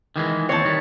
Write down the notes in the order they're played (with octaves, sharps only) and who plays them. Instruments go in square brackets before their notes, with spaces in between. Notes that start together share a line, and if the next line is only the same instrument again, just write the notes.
[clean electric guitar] D#3 E3 G#3
[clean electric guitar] D#2 E3 C4 [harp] C#5 A5
[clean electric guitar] D#3 G3